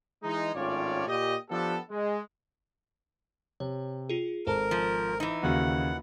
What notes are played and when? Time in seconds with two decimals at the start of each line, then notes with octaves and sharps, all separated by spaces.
0.23 E3 G#3 D#4
0.55 G#1 A2 C#4 F4 C#5 D5
1.07 A#2 G4 D#5
1.49 F3 B3 D4 G4 A4
1.90 G#3
3.60 C3 C#5
4.09 F4 G#4
4.47 G#1 A4 A#4 C5 A5
4.71 F3
5.20 E3 D#4
5.43 D#2 C#3 A#3 F#4 F#5